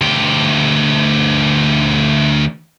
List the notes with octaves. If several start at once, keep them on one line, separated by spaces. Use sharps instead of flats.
D2 G4